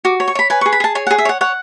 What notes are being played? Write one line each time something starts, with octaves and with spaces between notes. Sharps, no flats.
F#4 D6
C#5
C#6
C#5 B5
B4 G#5
C#6
G#4
B5
G#4 A5
C#5 G#5
F#5
G#4
E5
C#5 F#5
C#5 F#5